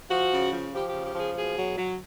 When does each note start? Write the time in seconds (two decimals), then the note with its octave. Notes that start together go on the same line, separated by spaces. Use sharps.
0.09 F3 F#4
0.31 C#3
0.51 F3
0.72 F3 G4
0.88 G4
0.93 C#3
1.04 G4
1.15 F3 G#4
1.36 B2 G#4
1.57 F#3
1.78 F#3